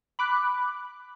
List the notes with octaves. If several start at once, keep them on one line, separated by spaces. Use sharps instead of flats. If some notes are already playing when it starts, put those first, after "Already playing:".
B5 D6 F#6